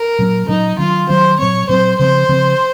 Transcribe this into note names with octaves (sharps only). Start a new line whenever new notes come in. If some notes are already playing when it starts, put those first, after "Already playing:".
Already playing: A#4
A#2 F#3 C#4
A#2 F#3 C#4 D#4
D#3 F#3 C#4 F4
D#3 F#3 C#4 C5
A#2 F#3 C4 C#5
A#2 F#3 C4 C5
C#3 F3 C4 C5
C#3 F3 C4